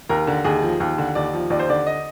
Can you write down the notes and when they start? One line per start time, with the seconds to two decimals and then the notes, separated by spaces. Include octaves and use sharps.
0.09 D#2 A#4
0.27 D3
0.44 D#2 G#4
0.62 F3
0.80 D#2
0.98 D3
1.15 D#2 D5
1.33 F3
1.50 D#2 D5
1.59 C5
1.69 D3 D5
1.86 D#5